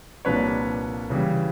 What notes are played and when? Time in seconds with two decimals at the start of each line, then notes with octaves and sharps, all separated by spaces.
0.25 C2 A#2 F3 A#3 D4 B4 C#5
1.10 C#3 E3 G3